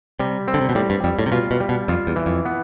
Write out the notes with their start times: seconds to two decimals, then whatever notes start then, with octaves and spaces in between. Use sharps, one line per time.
0.19 C3 G3
0.48 C4
0.54 D3
0.61 C3
0.69 B2
0.75 A2 G3
0.90 G2
1.04 F2 G3
1.19 A2
1.26 C3
1.32 B2 F4
1.51 B2
1.60 G3
1.69 B2
1.88 F2 F4
2.07 E2
2.16 E3
2.26 F2
2.45 B3